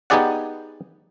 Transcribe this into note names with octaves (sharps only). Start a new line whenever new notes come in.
B3 D#4 G4 G#4 D5 F#5